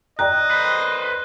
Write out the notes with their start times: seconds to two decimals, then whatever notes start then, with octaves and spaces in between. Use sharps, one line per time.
0.19 D5 D#5 G5 A#5 F#6
0.51 B4 C5